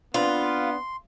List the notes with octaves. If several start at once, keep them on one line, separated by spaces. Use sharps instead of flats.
B3 C4 D4 F4 B4 C6